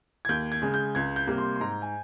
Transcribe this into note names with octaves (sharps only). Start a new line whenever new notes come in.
G#6
D#2 G6
G#6
C#3 G#3
G6
C#2 G#6
G6
C3 G3 A#3
C6
C6
G#2 A#5
G#5